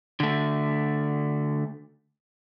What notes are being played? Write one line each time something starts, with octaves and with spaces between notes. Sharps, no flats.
D3 A3